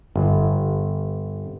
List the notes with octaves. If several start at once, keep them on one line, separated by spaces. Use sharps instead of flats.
G1